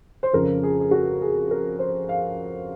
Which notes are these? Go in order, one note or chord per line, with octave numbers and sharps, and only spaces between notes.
C5
F2 C#3 F3 A#4
G#4
G#4
F#4
G#4
A#4
C5
F5